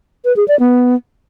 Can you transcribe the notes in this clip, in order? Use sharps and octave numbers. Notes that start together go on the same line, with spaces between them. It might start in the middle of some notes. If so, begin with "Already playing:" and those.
B4
G#4
D5
B3